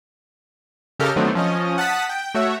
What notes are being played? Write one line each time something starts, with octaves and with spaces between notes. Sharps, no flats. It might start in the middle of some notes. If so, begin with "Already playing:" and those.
C#3 G4 A4 A#4 D#5 F6
D#3 F#3 A3 B3 C4 D4
F3 C#4 D#5
F#5 A5 D#6 B6
G5
A3 F#4 C#5 E5